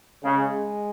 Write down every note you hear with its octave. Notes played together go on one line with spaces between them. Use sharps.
C#3 G#3